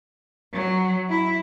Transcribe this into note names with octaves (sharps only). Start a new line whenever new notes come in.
F#3
E4